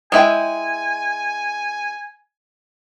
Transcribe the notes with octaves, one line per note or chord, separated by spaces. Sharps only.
G#3 E4 G5 G#5